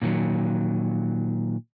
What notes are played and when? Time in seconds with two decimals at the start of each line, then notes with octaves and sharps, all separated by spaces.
0.02 A#2 D#3 E3 F#3